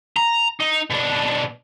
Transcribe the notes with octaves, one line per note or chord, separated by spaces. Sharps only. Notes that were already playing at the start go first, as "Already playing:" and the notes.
A#5
D#4
B2 D4